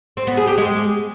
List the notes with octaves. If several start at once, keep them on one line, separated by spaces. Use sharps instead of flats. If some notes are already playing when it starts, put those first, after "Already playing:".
C4
B3
G#4
G4
G#3